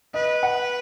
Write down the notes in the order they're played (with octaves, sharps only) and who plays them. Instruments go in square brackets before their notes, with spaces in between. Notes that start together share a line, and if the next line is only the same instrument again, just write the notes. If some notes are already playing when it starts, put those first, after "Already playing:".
[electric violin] B4 [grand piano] D#5
[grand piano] F#5